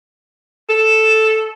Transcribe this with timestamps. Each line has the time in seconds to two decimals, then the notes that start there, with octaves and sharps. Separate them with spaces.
0.69 A4 E7